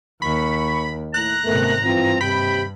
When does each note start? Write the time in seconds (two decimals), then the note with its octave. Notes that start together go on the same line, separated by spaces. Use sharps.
0.22 D#2 B5 C#6
1.14 A2 A#5 F#6
1.45 G#1 C3 A3 B3 A#4
1.85 G2 E3 C4 F4
2.21 D#2 C3 G4 G5 B5